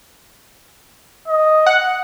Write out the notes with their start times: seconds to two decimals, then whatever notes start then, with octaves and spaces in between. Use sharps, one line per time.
1.28 D#5
1.66 F#5